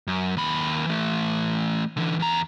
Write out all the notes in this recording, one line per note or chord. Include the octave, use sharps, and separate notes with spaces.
F#2
D#2 B5
E3 A3
D3 E3
E2 A#5